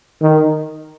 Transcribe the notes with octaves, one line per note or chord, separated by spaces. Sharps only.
D#3